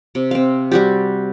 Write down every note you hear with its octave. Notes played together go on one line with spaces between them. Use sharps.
C3
C4 F5
G3 F#4 G4